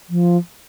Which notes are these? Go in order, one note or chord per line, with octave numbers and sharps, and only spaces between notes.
F3